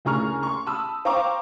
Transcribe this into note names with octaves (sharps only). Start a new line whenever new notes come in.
F#1 D2 G#4 A#5 C#6 F6
C6 C#6
A5 B5 D#6 E6
C5 F5 G5 A#5 C#6 D6